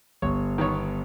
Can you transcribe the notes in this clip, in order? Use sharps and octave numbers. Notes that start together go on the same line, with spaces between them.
G1 C#5
D#3 B3 C#5